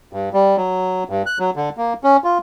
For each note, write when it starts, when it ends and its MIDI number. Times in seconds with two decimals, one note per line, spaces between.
0.13 0.29 43
0.33 0.56 55
0.57 1.04 54
1.10 1.23 43
1.26 1.38 90
1.39 1.50 54
1.56 1.69 50
1.77 1.93 58
2.04 2.17 61
2.24 2.38 65